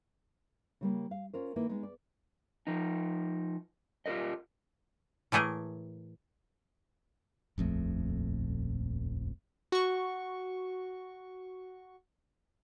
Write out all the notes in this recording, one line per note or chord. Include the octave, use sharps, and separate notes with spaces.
C#3 G3 A#3
F5
C#4 F4 A#4 C5
D#3 A#3 E4 B4
G#3 B3 D#4
D5
F3 D#4
F4 G4 A4 A#4 D#5
A2 E3 A3 G#4 A#4
D#1 A#1 F2 A3
F#4 C#6